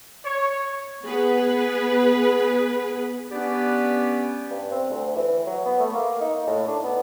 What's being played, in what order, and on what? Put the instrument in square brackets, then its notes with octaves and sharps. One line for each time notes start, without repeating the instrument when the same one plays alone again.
[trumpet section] C#5
[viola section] B3 G#4 B4
[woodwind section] B3 C#4 D4 G4 B4 D5
[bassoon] G2
C4
D2
E3
F#3
B3
A3
A#3
D#4
A2
D4
B3